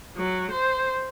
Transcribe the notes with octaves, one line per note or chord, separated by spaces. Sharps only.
F#3
C5